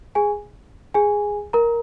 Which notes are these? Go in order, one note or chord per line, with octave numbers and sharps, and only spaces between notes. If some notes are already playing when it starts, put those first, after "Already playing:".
G#4 G#5
G#4 G#5
A#4 A#5